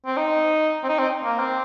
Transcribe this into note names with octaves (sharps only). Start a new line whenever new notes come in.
C4
D#4
C4
D#4
C4
A#3
C4